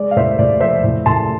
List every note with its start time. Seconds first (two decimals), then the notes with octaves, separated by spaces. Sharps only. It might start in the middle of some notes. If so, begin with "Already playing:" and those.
Already playing: G#3 D5
0.11 F5
0.16 A2 C5 E5
0.39 A2 D5
0.60 F3 C5 E5
0.84 A2
1.06 A2 A5 C6